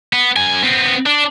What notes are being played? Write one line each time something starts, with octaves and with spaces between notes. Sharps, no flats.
B3
F#2 G#5
B3 C4
D4